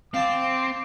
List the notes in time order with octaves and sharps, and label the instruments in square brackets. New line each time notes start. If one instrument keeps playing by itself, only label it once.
[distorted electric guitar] C4 [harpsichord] F5 A5 [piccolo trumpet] D6